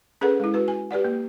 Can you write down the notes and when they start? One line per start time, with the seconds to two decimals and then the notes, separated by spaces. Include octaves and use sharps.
0.21 C#4 G#4 A4 B4 F#5
0.40 G#3 E4
0.54 F#4 B4
0.68 G#5
0.91 G4 B4 D5 F#5
1.04 A#3